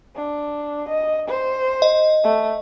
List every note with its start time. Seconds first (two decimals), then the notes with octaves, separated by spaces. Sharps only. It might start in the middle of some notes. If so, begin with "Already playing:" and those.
0.16 D4
0.89 D#5
1.28 C5
1.82 D#5
2.24 A3